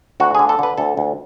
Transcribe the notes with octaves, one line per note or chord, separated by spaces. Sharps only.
D2 F#4
D3 G#4
A4
D3 B4
D2 A4
D2